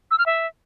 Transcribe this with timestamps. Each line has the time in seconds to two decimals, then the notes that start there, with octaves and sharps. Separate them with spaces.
0.11 E6
0.19 F6
0.26 E5